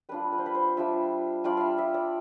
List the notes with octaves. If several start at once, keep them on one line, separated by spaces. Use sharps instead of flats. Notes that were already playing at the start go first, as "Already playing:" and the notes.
G3 D4 F4 B4
B4
C5
B4
C5
G3 D4 F4 E5
G3 D4 F4 D5
E5 F5
E5
D5